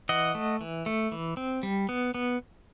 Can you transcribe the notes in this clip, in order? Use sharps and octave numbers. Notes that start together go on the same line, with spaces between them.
E3 D#5 F#5
A3
E3
A3
E3
C4
G3
B3
B3